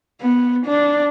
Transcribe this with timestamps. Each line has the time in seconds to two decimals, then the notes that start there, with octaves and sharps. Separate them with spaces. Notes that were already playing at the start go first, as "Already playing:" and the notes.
0.21 B3
0.66 D4